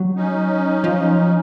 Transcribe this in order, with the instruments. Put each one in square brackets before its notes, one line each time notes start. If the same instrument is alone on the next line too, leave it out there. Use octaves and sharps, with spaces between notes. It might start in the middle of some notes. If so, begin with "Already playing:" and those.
Already playing: [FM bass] F#3
[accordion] C#4 D#4
[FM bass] F3